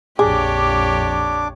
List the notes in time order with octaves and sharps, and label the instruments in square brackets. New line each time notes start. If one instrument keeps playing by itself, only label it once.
[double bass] A#1 F2 [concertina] D4 D6 [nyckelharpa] G4 C#5 [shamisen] G#4